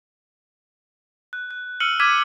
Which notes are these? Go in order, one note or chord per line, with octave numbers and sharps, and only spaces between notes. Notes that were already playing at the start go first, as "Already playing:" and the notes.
F#6
F#6
E6 F6 C#7 D#7 F#7
D6 F6 G#6 B6 D#7